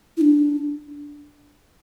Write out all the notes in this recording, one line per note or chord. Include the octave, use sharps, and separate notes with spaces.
E4
D4